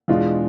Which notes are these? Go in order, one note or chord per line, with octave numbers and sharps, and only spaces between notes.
E2 B2 G#3 D4 F4